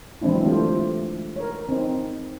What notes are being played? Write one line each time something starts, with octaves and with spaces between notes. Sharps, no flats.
E3 F#3 G#3 C4 D4 E4
G3 A3 F4 G4 C5
A#4 C#5
C4 D#4